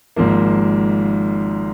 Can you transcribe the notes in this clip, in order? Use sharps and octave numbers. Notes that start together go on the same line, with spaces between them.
G#1 G#2 F3 A#3